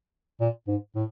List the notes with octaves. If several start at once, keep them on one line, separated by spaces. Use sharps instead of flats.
A#2
G#2
A2